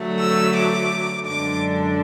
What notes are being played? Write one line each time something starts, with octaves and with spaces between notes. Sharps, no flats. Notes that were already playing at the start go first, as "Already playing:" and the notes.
Already playing: D3 F#3 A3
E6
D6
F#2 D3 G#3 D4 D6